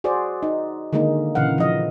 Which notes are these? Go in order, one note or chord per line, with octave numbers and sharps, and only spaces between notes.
F#4 G#4 C5 D5
D#4
D3 D#3 G#3 A#3 D#4
A#2 C#3 E3 F5 F#5
F3 D#5